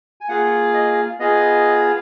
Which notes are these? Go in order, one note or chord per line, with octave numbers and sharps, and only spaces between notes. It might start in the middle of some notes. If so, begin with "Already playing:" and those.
G#5
A#3 F4 G#4 F#5
D#5
B3 F4 G#4 D#5